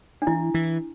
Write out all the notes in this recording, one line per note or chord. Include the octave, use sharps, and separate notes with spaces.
D4
E3 E4
E3